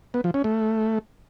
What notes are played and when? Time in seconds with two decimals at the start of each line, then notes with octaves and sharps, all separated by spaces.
0.14 B3
0.24 F3
0.34 C#4
0.44 A3